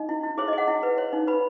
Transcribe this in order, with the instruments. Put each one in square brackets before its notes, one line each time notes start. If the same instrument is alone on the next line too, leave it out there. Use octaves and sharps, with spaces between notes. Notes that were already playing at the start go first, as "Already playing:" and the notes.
Already playing: [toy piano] D#4 D#5
E4
E4
G#4 C#5
D#5
G#4 F#5
E4
B4
C#5
D#4
B4 B5